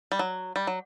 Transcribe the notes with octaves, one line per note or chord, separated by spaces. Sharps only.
G3
F#3
G3
F#3